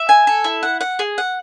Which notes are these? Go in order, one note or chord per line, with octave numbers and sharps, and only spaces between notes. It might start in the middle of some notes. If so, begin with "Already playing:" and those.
Already playing: E5
G#5
A4
E4
F#5
F#5
G#4
F#5